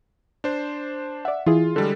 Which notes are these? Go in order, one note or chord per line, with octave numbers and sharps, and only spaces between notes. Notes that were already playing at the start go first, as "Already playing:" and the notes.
D4 C5
D5 E5 F#5
E3 E4 F4 G#4
D3 G3 G#3 A4